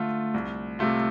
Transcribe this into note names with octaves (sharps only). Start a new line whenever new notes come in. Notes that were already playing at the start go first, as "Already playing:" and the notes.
Already playing: D3 A3 F4
C2
C3 A3 F4